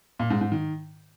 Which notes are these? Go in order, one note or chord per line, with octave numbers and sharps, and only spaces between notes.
A#2
G#2
G#2
D#3